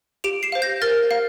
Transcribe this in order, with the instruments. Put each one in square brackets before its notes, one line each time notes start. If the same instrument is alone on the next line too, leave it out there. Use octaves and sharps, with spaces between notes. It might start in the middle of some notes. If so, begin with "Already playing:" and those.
[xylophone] G4 D7 F7
C7 E7
C5 F5
G6 A#6
A#4 F6 A6
F5